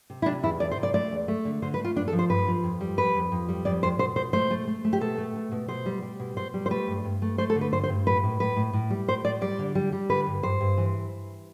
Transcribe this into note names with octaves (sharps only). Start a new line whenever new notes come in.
C3
E4
C3 D4
E2 E4
E2 D5
C5
C3
D5
A3 D5
E2
A3
D3
D3 C5
B4
A3 F4
G2 D4
A4
F3
C5
G2 B4
F3
F2
G3
F2 B4
F2
F2
G3
F2 D5
F2 C5
B2 C5
B2 C5
A3 C5
A3
A3
A3
G4
B2 A4
A3
B2
B2
B2 C5
G3
G3
B2
B2 C5
G3
C5
A3 B4
G2
G2
A3
A3 C5
A4
D3
B4
G2 C5
C5
G2
A2 B4
A2
A2 B4
A2
A2
G3
A2 C5
A2 D5
G3 D5
D3
G3
G3
D3 B4
G2
G2 C5
G2
E3